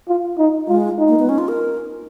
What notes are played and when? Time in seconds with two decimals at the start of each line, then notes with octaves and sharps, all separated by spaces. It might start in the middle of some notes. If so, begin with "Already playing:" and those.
0.08 F4
0.38 D#4
0.68 G#3 F4
0.98 D#4
1.08 A#3
1.19 B3
1.29 C#4
1.38 F4
1.48 A#4